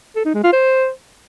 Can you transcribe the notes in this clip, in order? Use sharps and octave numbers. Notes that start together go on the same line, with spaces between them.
A4
D#4
G#3
F4
C5